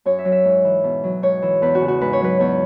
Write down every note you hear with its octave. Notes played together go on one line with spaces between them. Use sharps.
F#2 C#5
E5
F#3
E5
G#2
E3
B2
F#3
G#2 C#5
E3
E2 B4
F#4
C#3
F#4
G#2 B4
C#5
F#3 B4
E2 C#5